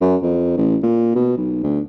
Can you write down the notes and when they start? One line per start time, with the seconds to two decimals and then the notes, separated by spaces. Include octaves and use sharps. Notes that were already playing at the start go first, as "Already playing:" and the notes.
0.01 F#2
0.23 F2
0.57 A1
0.83 A#2
1.15 B2
1.37 B1
1.63 D2